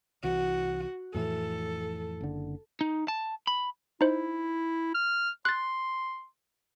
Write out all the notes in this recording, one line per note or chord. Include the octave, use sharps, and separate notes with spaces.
C2 E3 F#4
F2 A2 E3 A4
F#1 D3
D#4
A5
B5
D#4 E4 C5
F6
C6 F#6 A6